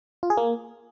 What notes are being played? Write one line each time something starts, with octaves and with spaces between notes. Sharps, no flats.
F4
G#4
A#3